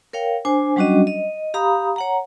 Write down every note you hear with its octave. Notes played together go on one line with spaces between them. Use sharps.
A#4 C#5 F5 G5
D4 C5 G#5
F#3 G3 C#4 D4 F#4 D#5
D#5
G4 F5 A#5 B5 D#6
C#5 F#5 A#5